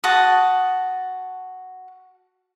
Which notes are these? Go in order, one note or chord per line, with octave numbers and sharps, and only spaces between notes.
F#4 A5 D#6